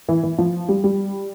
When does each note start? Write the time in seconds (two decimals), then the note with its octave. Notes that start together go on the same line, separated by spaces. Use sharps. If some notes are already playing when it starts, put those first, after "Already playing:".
0.08 E3
0.23 E3
0.38 F3
0.69 G3
0.84 G3